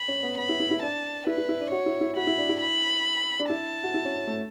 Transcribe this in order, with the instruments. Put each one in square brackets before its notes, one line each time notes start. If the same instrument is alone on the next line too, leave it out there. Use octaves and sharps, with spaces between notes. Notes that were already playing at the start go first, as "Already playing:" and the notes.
Already playing: [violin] B5
[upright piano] C#4
B3
[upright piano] B3 [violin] B5
[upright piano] E4
E4
E4
[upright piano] D4 [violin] A5
[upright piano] E4 [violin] B4
[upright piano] E4
E4
D4
[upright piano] F#4 [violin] C#5
[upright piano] E4
E4
[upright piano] F#4 [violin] B5
[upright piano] E4
D4
E4
[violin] B5
[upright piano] D4
[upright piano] E4 [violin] A5
[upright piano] F#4
E4
C#4
C#4
A3